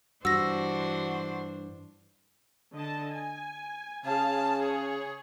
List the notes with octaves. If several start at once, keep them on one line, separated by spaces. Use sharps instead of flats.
G2 E3 D4 F#4 C5 E6 A#6
D3 D#5 A5
G#5
C#3 G#4 F5 A5
G#4 C#5